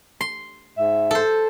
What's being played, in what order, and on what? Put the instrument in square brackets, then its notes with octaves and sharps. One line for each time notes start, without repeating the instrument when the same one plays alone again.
[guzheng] C6
[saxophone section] G#2 E5
[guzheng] A4 C5